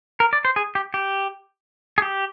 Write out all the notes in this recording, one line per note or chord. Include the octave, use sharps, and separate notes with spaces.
A#4
D5
C5
G#4
G4
G4
G#4
G4